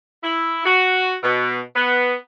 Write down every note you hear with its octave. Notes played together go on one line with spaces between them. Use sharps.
E4
F#4
B2
B3